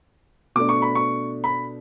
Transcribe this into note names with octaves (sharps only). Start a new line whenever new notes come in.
B2 A3 D4 D6
C#6
B5
C#6
B5